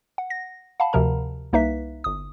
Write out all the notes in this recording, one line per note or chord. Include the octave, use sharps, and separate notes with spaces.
F#5
A#6
F5 F#5 A5 B5
D2 C3 F3 A#4 A#5
C2 A#3 D#4 B4 E5 B6
G1 D#6